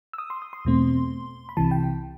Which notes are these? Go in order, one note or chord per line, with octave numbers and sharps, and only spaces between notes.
E6
D#6
C6
D#6
C6
E2 B2 A3 C4
B5
C2 C3 E3 A5
G5